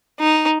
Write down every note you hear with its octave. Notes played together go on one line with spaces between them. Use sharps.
D#4